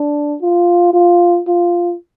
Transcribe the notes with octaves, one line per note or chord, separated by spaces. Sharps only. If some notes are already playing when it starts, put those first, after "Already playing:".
Already playing: D4
F4
F4
F4